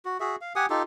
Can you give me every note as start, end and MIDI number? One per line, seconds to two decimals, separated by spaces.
0.05 0.18 66
0.20 0.36 66
0.20 0.36 68
0.20 0.36 76
0.41 0.53 77
0.56 0.66 67
0.56 0.66 78
0.56 0.66 80
0.56 0.66 87
0.70 0.83 63
0.70 0.83 65
0.70 0.83 67
0.70 0.83 69